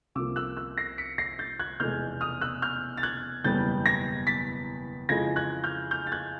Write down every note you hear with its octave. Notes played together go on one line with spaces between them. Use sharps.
C2 C3 F3 A#3 D6 E6
E6 F#6
E6 F#6
A#6 C7
B6 C#7
A#6 C7
G6 A6
F#6 G#6
F1 E2 B2 G#3 F6 G6
D#6 F6
E6 F#6
F6 G6
A6
F#6 G#6
F#1 E2 B2 G3 B3 G6 A6
G#6 A#6
A6 B6
F2 C#3 E3 G#3 G#6 A#6
F#6 G#6
F6 G6
F6 G6
A6
F#6 G#6